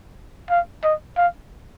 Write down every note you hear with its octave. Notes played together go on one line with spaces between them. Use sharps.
F5
D#5
F5